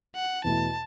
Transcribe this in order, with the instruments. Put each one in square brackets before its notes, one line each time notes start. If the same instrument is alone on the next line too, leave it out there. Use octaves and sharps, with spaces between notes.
[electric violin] F#5
[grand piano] E2 B2 A3 E4 [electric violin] A5